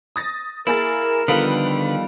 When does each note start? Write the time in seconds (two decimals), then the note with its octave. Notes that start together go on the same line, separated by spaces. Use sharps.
0.16 D#6 A6 A#6
0.67 A#3 E4 G#4 A#4 A6
1.28 D3 D#3 F3 G3 B3 F4 A4 B4